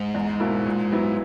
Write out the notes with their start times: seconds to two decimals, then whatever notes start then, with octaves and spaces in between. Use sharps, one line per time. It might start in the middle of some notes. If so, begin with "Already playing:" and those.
Already playing: G#2
0.14 E2
0.40 B2 A#3 E4
0.66 A#2
0.92 F#3 B3 E4